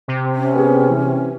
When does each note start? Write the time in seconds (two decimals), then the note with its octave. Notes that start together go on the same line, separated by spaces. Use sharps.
0.08 C3
0.35 C#4
0.54 B3 G4 G#4
0.90 E3